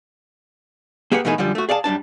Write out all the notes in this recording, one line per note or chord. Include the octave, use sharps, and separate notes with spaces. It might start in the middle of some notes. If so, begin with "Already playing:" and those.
A#3 G4 G#4 B4 F#5
B2 E3 A3 A#3 D#4 G#4
F#2 D3 F3 G3
A3 F#4
G#4 D5 F5 F#5 A5
F#2 G3 D4 A5